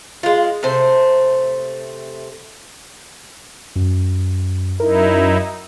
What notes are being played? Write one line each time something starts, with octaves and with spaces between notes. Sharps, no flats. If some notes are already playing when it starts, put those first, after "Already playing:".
G#3 F4
C3 A3 C5
F#2
F#2 D#4 E4 A#4